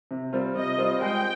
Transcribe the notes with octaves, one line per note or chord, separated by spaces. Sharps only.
C3
G3 C4 F4
C3 D#5
G3 C4 F4
G#3 G5